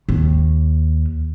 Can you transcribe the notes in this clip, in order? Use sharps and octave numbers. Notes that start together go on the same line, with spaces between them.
D#2